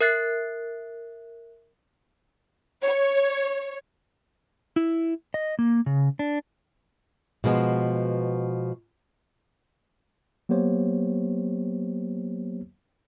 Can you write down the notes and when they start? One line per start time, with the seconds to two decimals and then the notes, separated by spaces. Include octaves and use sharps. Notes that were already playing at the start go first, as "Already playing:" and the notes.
0.01 A#4 E5 F#6 A6 C7
2.82 C#5
4.76 E4
5.34 D#5
5.59 A#3
5.86 C#3
6.19 D4
7.44 B2 F3 G#3 B3
10.49 F#3 A#3 B3 G4 C5 C#5